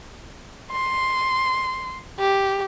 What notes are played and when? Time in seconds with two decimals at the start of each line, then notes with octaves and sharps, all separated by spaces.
0.72 C6
2.19 G4